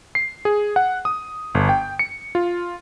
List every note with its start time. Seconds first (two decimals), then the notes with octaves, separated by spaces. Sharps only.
0.15 C7
0.45 G#4
0.76 F#5
1.05 D#6
1.55 G1
1.69 G5
1.99 C#7
2.35 F4